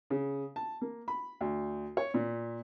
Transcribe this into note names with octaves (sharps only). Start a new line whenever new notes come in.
C#3
A5
A#3
B5
D2
C#5
A#2